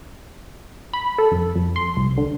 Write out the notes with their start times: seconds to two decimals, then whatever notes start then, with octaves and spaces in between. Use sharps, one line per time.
0.93 B5
1.18 A4
1.32 F2
1.56 F2
1.76 C6
1.97 C2
2.18 D3